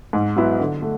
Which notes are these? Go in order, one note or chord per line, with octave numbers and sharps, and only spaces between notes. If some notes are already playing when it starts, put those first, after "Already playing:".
G#2
F#3 B3 E4
D3
A3